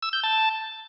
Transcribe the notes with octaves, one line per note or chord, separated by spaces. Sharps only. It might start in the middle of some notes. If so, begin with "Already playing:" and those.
E6
G6
A5